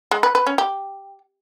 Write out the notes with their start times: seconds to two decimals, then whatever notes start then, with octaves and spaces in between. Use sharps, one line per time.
0.11 G#3
0.23 B4
0.35 B4
0.47 C#4
0.58 G4